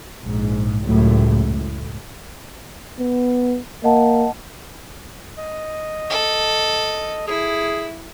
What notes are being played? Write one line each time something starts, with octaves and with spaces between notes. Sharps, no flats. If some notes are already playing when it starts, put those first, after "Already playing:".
A#1 G#2
C#2 F#2 A2 A3
A2
B3
A#3 D#5 F#5 A5
D#5
A4
E4 G#4